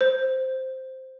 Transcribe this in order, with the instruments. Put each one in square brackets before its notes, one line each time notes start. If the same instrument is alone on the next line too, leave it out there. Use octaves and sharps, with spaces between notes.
[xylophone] C5